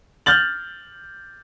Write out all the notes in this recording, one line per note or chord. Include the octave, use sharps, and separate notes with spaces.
F6 G6 A6 F#7